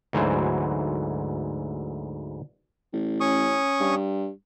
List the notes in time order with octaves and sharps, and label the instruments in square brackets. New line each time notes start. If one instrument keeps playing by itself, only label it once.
[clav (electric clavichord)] D2 G#2 E3 F#3 C5
[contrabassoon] A1
[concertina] C#4 C#6 D#6
[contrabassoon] G2